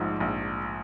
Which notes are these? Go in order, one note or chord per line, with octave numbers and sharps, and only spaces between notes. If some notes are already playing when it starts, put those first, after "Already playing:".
Already playing: A#1 G#2 F3
A#1